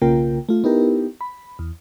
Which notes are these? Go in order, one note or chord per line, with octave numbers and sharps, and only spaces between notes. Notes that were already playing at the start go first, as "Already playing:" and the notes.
B1 C#3 A#3 F4 A#4 G5
A3 F4
B3 D#4 E4 G4 A#4
B5
E2